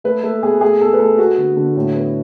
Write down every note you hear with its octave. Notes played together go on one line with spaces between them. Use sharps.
A3 B4
A3 A4
B2 G#4
A3 G#4
B2 A4
B4
A3 A4
B3 F#4
D3
D3
A2
B3